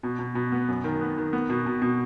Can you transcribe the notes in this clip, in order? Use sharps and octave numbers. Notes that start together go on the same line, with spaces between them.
B2
B2
B2
B3
F#2
D#3
B3
D#3
B3
B2
B2
B2